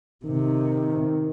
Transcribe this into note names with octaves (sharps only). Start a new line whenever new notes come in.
C3 D#3